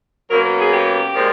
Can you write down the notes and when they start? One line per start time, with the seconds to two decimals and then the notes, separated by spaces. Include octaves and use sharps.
0.31 B2 F#3 A#3 C#4 A#4
0.59 G#4
0.73 G4
1.14 A#2 F3 G#3